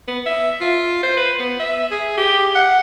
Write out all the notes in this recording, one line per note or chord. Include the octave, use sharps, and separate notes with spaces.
B3
E5
F4
C5
B4
B3
E5
G#4
G4
F#5